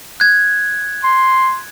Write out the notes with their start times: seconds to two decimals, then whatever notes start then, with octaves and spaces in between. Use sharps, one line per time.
0.20 F#6 G#6
1.04 C6